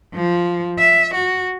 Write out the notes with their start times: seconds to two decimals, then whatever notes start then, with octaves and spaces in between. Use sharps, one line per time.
0.15 F3
0.79 E5
1.14 F#4